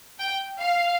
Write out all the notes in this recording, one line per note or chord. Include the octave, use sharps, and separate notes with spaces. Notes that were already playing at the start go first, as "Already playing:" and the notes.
G5
F5